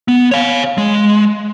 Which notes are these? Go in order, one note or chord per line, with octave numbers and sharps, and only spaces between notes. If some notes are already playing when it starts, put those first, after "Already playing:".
B3
C#5 F5
G#3